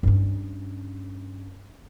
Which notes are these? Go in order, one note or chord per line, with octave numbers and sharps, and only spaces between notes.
G2 C#4